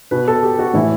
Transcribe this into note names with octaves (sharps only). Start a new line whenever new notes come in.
B2 B4
A4
G4
F#4
A2 E3 E4